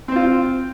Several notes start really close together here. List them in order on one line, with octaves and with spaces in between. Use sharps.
C4 C5 F4